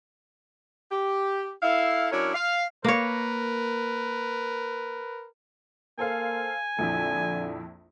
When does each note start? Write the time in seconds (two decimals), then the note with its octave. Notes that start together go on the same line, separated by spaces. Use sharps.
0.91 G4
1.63 E4 A4 F5
2.12 F#3 C#4 D4 E4 A#4 C#5
2.34 F5
2.84 A#3 A#4 B4 C#5
5.99 A#3 A4 C5 F5 G#5
6.79 A#1 F2 D3 E4